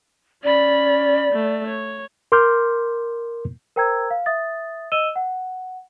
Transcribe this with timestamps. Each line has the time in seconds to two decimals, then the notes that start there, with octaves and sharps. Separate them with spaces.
0.43 C#4 D5 B5
1.33 A3
1.67 C#5
2.32 A#4 C6 D6 F6 G6
3.76 A#4 C5 G5 A#5 E6 G#6
4.11 F5
4.26 E5 D#6 A6
4.92 D#5 E6 D#7 E7 G7
5.16 F#5